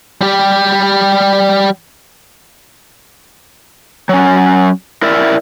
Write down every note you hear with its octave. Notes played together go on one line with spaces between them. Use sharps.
G3 G4
F#3 C#4
E4 A#4 D5 E5